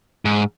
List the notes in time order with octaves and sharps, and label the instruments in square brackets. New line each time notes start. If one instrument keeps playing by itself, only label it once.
[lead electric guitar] G#2